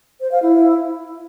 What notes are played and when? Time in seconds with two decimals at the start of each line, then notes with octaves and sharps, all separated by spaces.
0.21 C5
0.32 F5
0.42 E4